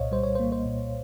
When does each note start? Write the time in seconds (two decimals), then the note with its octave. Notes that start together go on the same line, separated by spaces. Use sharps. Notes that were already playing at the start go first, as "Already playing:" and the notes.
Already playing: C2 A#2 C5 C#5 D#5 F5
0.12 G3 C5
0.23 C#5
0.35 A#3 C5
0.52 C5
0.66 A#2